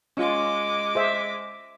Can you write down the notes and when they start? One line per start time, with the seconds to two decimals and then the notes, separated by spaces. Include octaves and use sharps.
0.17 G#3 C#4 F4 D#5 D6
0.95 G#4 C5 E5